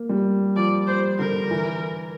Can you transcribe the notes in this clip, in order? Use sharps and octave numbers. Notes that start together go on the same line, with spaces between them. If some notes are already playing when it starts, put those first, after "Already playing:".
Already playing: A#3
G3
F3 D5
C5
D3 A#4
E3